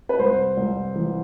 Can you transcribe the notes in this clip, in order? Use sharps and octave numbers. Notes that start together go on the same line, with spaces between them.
B4
C2 C5
C2
E3